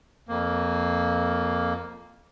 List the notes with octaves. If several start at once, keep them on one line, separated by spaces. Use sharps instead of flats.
F2 A#3